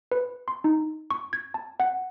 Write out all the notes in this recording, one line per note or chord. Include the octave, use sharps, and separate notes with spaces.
B4
C6
D#4
C#6
G#6
A5
F#5